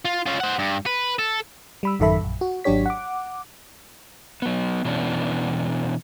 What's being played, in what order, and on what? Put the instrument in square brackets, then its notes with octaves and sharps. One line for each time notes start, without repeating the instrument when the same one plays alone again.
[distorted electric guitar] F4
C#4 F4
C5 F#5
G2
B4
A4
[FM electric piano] G3 B5 E6
A1 F#2 D#3 A4 E5 B5
A#1 F#2
F#4
G#1 F#3 D4 G4 C#5 B6
F#5 D6
[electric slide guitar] F#3 B3
B2 E3 B3 C#4 D4